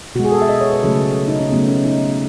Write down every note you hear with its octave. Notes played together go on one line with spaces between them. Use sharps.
B2 G#3 F#4
G#4
A4
E5
D#5
C#5
B4
C#3 F#3 A3 A4
D#4
C#4
C#3 F#3 A3 B3
C#4
D#4